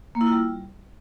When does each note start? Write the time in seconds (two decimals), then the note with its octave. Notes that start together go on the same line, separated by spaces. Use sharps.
0.15 A#3
0.21 E4
0.27 F4
0.32 G3